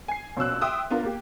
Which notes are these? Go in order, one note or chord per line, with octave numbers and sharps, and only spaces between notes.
G#5 C7
A#1 B2 C#4 E6 F#6
E5 G5 C6 D#6 E6
B3 D4 F4 A#4
A#3 G4